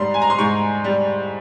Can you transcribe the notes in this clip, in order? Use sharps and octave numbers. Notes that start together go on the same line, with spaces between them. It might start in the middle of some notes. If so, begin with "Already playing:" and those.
Already playing: G#2 G3 C6
G#5
A#5
C6
G#2 C#6
G3